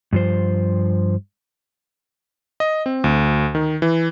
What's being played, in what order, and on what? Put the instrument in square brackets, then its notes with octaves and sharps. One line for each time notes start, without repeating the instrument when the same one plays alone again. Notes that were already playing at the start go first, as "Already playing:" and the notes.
[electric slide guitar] G2 F3 C5
[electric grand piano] D#5
C4
D2
D#3
E3